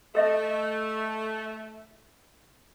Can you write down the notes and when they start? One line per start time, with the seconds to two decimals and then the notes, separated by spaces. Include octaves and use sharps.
0.15 A3 A4 D#5 E5